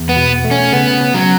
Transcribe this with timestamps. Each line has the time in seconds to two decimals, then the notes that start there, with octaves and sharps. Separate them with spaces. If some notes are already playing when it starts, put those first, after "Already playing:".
Already playing: E2
0.09 B3
0.16 B2
0.44 A3
0.51 C#4
0.72 C#3 B3
1.01 C#4
1.14 F#3